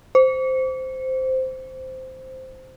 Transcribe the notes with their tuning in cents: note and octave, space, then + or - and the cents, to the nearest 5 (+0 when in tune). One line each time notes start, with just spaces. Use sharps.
C5 -5